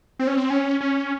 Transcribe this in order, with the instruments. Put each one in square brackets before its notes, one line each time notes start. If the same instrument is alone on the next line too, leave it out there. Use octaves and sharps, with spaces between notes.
[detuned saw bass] C4
C#4
C4
C#4
C#4